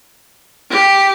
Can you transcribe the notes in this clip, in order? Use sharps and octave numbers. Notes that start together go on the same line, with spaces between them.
G4